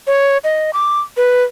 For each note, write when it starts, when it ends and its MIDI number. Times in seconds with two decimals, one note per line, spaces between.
0.07 0.38 73
0.44 0.71 75
0.73 1.00 86
1.17 1.43 71